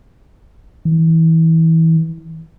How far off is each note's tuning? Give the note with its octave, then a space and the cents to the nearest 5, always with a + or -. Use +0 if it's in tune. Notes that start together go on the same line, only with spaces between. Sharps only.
E3 -25